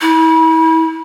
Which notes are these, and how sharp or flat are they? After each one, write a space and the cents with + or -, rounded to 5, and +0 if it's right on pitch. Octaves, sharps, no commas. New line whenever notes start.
E4 -35